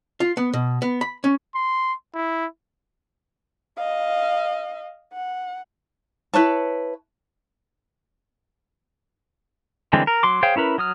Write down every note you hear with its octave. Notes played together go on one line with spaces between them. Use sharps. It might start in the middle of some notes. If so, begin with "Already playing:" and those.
F4
B3
B2
B3
B5
C#4
C6
E4
D#5 F5
F#5
E4 B4 C#5 A5
D3 E3 G3 G#3 C4
A#4
F#3 C6 D6
G#4 C5 C#5 F5 G5
C#4 E4 A#4 B4
F#3 D#6 F6